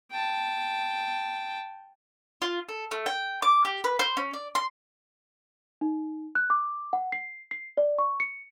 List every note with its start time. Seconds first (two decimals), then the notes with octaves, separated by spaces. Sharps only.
0.11 G5 A5
2.42 F4
2.69 A4
2.91 A3
3.06 G5
3.42 D6
3.65 G4
3.84 B4
3.99 C5
4.17 C#4
4.34 D5
4.55 C6
5.81 D#4
6.35 F#6
6.50 D6
6.93 F#5
7.12 C7
7.51 C7
7.77 D5
7.99 C#6
8.20 C#7